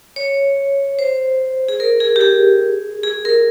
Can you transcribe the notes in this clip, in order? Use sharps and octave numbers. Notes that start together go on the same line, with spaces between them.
C#5
C5
G#4
A#4
G#4
G4
G#4
G#4
A#4